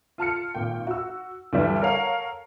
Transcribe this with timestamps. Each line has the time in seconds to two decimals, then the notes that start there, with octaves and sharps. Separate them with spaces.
0.18 F4 A5 F6 C#7
0.54 G#1 A#2 G5
0.87 F#4 E6
1.53 D2 G2 E3 G3 D4 E5
1.81 A4 A#4 C#5 F5 F#5